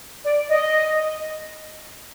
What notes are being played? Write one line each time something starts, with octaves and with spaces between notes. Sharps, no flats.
D5
D#5